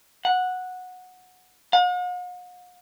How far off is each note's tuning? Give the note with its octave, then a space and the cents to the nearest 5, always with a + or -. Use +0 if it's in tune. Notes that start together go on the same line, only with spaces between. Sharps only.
F#5 -10
F#5 -45